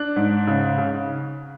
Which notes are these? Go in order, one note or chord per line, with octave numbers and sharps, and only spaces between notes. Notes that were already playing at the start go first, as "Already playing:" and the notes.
Already playing: D4 F#6
G#2
C#3
C#3